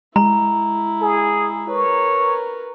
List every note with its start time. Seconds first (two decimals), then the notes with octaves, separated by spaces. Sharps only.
0.16 G#3 E4 A#5
1.01 G#4
1.69 A#4 B4 C#5